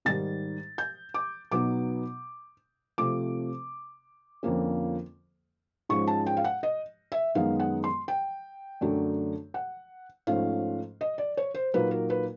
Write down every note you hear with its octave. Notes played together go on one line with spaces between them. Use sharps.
G#2 D#3 G3 A6
G6
D6
B2 F#3 B3 D#4 D6
C3 F3 A3 C4 D6
F2 D3 F3 A#3 C#4
G#2 F3 G#3 C#4 C#6
A5
G5
F5
F#5
D#5
E5
F#2 D#3 G#3 B3 D#4 F5
F#5
C6
G5
F#2 D3 F#3 A3 D4
F#5
G#2 F3 A3 C#4 F5
D#5
D5
C#5
C5
A#2 F#3 A#3 D#4 B4
A#4
B4